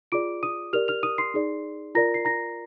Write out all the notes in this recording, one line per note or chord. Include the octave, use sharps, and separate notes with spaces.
F4 G#4 D5 D6 D7
D#6 D#7
G4 A#4 D5 F6 F7
F6 F7
D#6 D#7
C6 C7
D#4 G#4 D5
F4 A#4 D5 A#5 A#6
C7
A#5 A#6